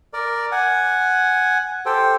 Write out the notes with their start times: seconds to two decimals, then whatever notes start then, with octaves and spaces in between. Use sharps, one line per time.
0.13 A#4 D5
0.52 F#5 G#5
1.86 G4 A4 C5 G5